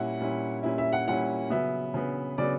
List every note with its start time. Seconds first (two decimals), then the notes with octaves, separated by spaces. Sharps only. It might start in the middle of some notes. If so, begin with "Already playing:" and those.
Already playing: A#2 G3 C#4 E4 F#5
0.21 A#2 G3 C#4 E4
0.63 A#2 G3 C#4 E4
0.78 E5
0.93 F#5
1.08 A#2 G3 C#4 E4 F#5
1.50 C#3 F#3 B3 E5
1.94 C#3 F#3 B3
2.38 C#3 F#3 B3 D5